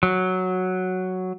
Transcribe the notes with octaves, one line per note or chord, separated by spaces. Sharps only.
F#3